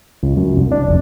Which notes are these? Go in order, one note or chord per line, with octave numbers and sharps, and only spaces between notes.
C#2
F#2
C2
D4
F1